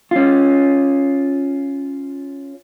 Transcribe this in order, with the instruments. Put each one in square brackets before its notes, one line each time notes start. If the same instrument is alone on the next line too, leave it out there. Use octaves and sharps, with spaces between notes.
[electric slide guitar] C#4 F4